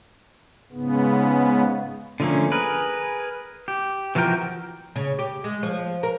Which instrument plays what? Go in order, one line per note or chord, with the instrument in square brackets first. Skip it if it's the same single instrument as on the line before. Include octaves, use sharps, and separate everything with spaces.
[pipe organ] G#2 C#3 B3
[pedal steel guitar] D3 F3 A3 A#3 C#4
G#4 A#4 B4
G4
E3 F3 F#4 A#4 G5
[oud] C#3
G4
G#3
F3
A#4